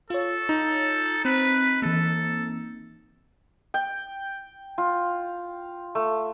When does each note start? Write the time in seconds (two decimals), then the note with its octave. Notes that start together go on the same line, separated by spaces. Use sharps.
0.10 F4 A4 C#5
0.49 D#4
1.25 C4 B4
1.82 E3 A#3 A4
3.74 G5
4.78 F4
5.95 A3